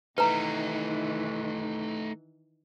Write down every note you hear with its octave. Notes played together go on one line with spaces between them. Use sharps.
D#3 E3 A3 D#4 B4 A#5